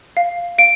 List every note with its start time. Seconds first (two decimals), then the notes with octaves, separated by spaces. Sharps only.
0.17 F5
0.58 F5 D7